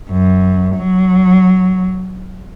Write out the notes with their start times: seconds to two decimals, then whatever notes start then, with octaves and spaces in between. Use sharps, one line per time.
0.11 F#2
0.77 F#3